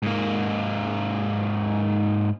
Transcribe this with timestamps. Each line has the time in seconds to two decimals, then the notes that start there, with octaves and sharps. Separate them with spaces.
0.03 G#2 A#3